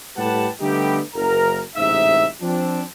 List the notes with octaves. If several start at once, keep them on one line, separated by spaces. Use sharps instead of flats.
A2 G3 G4 B4 F#5 A5
D3 G3 A3 B3 D#4 G4
F#1 A#4 A#5
A1 G#2 C3 D#4 E5
F3 C4 D4